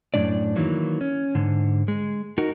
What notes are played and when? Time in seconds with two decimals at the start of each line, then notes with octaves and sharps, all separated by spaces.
0.14 F#2 A2 C#3 G3 D4 D5
0.56 D#3 E3 F#3 A#3
1.01 C#4
1.35 G#2 D3
1.88 G#3
2.38 D#4 F#4 A#4